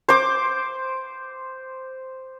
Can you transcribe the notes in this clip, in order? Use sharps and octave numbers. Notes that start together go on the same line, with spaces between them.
C5 D6